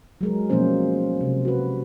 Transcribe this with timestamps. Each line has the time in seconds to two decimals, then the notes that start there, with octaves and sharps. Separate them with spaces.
0.21 F#3 G#3 A#4
0.50 B2 F3 F#3 A#3 C#4 C5
1.21 C3
1.45 F#4 B4